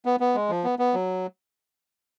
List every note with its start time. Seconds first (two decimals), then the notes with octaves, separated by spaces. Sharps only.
0.05 B3
0.20 B3
0.35 G#3
0.49 F3
0.64 B3
0.79 B3
0.94 F#3